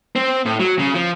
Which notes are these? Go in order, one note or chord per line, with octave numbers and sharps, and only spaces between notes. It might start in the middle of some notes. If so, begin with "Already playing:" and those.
C4
A2
F#3
C#3
F3